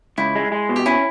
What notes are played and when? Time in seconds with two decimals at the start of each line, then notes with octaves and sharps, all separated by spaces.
0.18 C#2 E4
0.35 G#3
0.52 G#3
0.69 B2
0.76 G4
0.86 C#4 E4